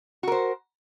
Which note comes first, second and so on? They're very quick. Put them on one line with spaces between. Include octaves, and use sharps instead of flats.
F#4 A#4 C5